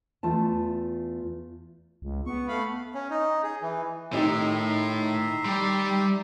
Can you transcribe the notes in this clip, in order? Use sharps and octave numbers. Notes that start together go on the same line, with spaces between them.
E2 A3 F4 A5
C#2
B3 C#6
A3 F5 B5
C#4
D#4
G#4
E3
A2 D#3 D#4 G4 E5 A#5 C6
G3 D5